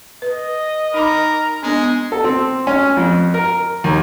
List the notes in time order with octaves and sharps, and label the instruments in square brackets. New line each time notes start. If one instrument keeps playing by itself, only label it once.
[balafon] B4 [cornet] D#5
[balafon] D#4 B5 D6 [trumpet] A#4
[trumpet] G#3 [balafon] B3 D4
[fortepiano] A4
C4
C#4
F2
A#4
D#2